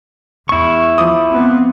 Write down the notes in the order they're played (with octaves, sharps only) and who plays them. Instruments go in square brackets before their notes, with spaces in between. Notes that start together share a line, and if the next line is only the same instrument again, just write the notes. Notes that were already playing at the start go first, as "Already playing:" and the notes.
[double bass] E2 [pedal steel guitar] E4 C#6
[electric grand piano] F3 D6 D#6
[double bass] B3 C4